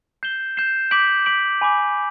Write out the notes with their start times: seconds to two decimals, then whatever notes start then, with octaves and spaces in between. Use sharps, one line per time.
0.23 G6 C7 E7 G7
0.57 G6 C7 E7 G7
0.91 D6 G6 B6 D7 F#7
1.26 D6 G6 B6 D7 F#7
1.61 G#5 B5 D6